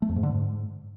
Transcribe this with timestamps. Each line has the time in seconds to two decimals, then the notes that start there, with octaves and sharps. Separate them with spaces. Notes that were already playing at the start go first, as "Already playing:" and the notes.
0.02 A3
0.09 F2
0.16 G#2
0.23 D3
0.30 G#2